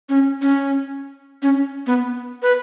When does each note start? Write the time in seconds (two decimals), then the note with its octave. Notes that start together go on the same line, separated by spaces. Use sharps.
0.09 C#4
0.42 C#4
1.42 C#4
1.87 B3
2.42 B4